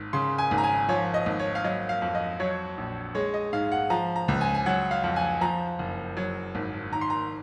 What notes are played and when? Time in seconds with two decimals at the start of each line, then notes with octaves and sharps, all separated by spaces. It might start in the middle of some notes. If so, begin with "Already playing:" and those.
Already playing: G#1
0.13 C#3 C6
0.38 G#5
0.51 G#1
0.58 A#5
0.64 G#5
0.89 F3 C#5
1.14 D#5
1.26 G#1
1.39 C#5
1.55 F5
1.64 F#3 D#5
1.89 F5
2.02 F2
2.15 D#5
2.40 F#3 C#5
2.78 A#1
3.15 G#3 C#5
3.34 D#5
3.53 G#2 F5
3.72 F#5
3.90 F3 A#5
4.16 A#5
4.28 C#2
4.41 G#5
4.54 G#5
4.66 F#3 F#5
4.91 F5
5.04 F2
5.16 G#5
5.41 F3 A#5
5.79 F#1
6.17 F#3
6.55 G#1
6.92 D#3 A#5
7.01 C6
7.10 A#5